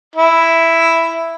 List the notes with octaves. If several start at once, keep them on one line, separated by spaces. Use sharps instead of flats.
E4